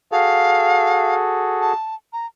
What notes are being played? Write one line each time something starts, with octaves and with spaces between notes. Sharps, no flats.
F#4 G#4 A4 F5
A5
A#5